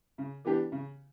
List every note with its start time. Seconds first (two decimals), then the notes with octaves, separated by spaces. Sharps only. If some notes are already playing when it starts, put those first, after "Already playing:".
0.18 C#3
0.45 E3 B3 D4 G4
0.72 C#3